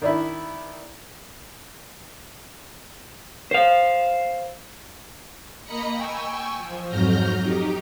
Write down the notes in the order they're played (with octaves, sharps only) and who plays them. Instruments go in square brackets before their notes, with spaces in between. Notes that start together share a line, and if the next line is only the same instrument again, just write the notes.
[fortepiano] D#3 D4 E4
[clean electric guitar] C5 F5
[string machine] A#3 D#5 A#5 B5 A#6 C#7
G5 G#5 C#6 E6
F3
F2 G#2 F#3 F6 G6 A#6
D#4 G4